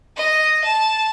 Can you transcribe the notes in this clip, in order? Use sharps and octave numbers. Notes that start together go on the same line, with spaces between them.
D#5
A5